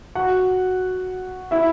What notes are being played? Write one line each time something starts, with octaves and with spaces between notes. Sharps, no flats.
F#4 F#5
E4 E5